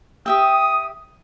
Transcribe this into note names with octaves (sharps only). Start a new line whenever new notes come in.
G4 E5 G5 D#6